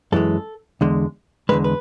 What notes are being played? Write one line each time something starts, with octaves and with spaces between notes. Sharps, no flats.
F#2 E3 G#3 A4
E2 D3 G#3
E2 D3 G#3 B4
B4